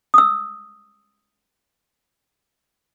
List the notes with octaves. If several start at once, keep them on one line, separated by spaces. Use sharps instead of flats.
D#6 E6